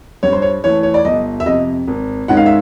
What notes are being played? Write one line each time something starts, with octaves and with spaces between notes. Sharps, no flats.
G2 C#5
C5
C#5
E3 A3 C#5
C#5
D5
G1 D#5
E5
F2 C3 D#5
G#1
G#2 D#3 G#3 C#4 F#5
F5
E5